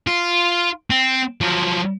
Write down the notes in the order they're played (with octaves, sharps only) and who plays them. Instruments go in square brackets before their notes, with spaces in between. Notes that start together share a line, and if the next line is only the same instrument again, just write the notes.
[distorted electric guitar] F4
C4
F3 F#3